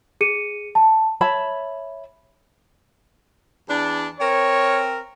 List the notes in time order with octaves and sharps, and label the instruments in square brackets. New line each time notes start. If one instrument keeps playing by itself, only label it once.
[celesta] G#4 C#7 D#7
A5
[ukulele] C#5 E5 A5 B5
[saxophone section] E2 D4
[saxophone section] C4 A#4 [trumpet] C#5